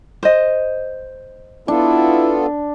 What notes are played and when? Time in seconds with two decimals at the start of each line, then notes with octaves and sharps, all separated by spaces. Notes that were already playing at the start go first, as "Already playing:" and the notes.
0.23 C5 D#5
1.68 B3 D4 E4 F4 A4